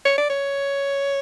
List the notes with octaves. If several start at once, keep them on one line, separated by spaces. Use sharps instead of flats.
C#5
D5
C#5